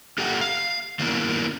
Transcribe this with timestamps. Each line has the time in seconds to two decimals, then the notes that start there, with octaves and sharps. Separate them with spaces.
0.18 A#3 G4 A4 E5 F#5 G5
0.41 F5
0.99 D#3 A#3 B3 C#4 E4 A#4